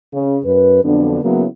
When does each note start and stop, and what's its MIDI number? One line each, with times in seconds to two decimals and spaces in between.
0.13 0.39 49
0.44 0.81 42
0.44 0.81 71
0.83 1.20 41
0.83 1.20 50
0.83 1.20 54
0.83 1.20 59
0.83 1.20 62
1.22 1.45 49
1.22 1.45 54
1.22 1.45 58
1.22 1.45 59
1.22 1.45 64